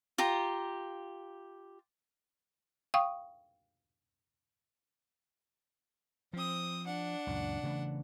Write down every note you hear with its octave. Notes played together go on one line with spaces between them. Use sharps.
F4 G4 A#5
F5 G5 C#6 D#6
F3 C4 D#6
D4 F#5
C#2 F#2 A#2
C#3 E3 A3